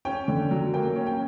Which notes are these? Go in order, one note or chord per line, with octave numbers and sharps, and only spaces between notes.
C#4 G5
D3
F#3
A#3 G5
C#4
G5